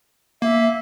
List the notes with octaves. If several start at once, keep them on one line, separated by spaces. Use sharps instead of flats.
A#3 E5